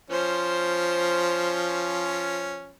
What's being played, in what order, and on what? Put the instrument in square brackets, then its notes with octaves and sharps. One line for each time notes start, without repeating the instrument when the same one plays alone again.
[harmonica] F3 C#4 [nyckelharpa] C5